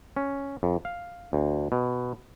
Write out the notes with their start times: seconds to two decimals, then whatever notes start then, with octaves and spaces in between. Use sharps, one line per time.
0.16 C#4
0.63 F2
0.85 F5
1.33 D2
1.72 B2